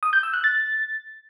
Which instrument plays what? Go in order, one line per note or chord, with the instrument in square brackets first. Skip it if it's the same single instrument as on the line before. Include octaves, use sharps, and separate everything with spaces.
[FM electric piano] D#6
G6
E6
F#6
A6